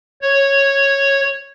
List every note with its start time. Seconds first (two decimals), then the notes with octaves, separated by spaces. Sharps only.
0.22 C#5